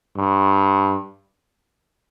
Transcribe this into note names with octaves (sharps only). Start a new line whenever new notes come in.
G2